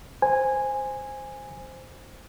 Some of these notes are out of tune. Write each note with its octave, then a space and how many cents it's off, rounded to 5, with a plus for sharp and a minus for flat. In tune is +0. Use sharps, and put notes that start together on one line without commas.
C5 +0 G#5 -10